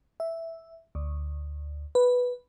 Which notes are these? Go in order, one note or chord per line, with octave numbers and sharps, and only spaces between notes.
E5
D2
B4